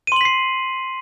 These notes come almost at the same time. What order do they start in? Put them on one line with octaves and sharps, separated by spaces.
D#7 C6 F#7 B6 C7